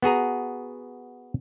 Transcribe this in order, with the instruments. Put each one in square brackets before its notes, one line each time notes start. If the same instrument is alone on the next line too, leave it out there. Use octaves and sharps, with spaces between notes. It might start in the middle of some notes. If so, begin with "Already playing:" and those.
[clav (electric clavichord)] B3 F#4 G#4 A#5